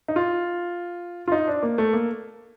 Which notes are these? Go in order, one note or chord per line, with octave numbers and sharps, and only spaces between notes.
D#4
F4
F4
D#4
D4
A#3
A3
A#3